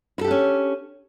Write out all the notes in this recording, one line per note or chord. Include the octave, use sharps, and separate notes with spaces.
C#4 D4 E4 G4 A4